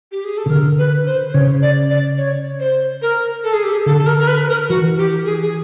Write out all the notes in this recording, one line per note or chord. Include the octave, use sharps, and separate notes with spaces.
G4
G#4
A4
C#3
D3 A#4
B4
C5
C5
C#3 C#5
D5
D5
C#5
C5
A#4
A4
G#4
G4
G#4
D3 A4
A4
A#4
A#4
B4
B4
A#4
E3 F#4
G4
G#4
G#4